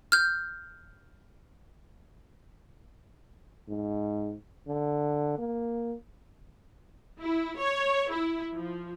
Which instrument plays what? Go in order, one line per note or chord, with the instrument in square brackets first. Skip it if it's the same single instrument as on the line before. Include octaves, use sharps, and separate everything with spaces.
[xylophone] F6 G6
[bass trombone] G#2
D3
A#3
[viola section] E4
C#5
E4
F3